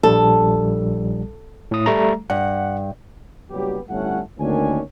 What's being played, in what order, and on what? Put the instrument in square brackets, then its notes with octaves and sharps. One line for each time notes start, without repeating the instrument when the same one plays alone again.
[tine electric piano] A#1 G3 [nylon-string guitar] A4
[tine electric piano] A2 D#6
G3 A3 A#5
[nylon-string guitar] G2 [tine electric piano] F#5
[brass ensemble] F#1 F#3 G3 B3 G4
G1 A2 G3 A3 C#4 F#5
D2 D#3 A#3 C#4 D4 G#5